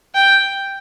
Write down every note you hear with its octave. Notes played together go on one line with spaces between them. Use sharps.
G5